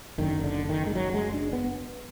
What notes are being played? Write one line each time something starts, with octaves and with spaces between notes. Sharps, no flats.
F#1 F#2 D3 D#3
D3
D#3
G#3
F#3
G#3
D4
B3